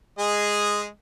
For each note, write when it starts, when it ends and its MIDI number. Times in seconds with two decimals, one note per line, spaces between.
0.19 0.88 56
0.19 0.88 68
0.19 0.88 75